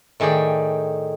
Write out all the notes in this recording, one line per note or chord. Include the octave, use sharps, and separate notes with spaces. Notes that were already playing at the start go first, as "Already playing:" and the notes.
A2 D#3 G#4 D5 G5